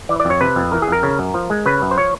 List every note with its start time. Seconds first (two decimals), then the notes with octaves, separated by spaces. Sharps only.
0.09 E3 D5
0.20 D5
0.25 F2
0.30 C#5
0.41 C3 B4
0.56 F2
0.72 E3 A#4
0.82 G#4
0.87 F2 A#4
1.03 C#3
1.19 F#2
1.34 F3
1.50 G#3
1.66 C#3 B4
1.82 F#2
1.91 C5
1.97 F3 C#5